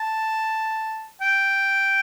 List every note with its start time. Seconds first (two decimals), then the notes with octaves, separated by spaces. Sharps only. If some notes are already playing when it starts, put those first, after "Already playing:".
Already playing: A5
1.21 G5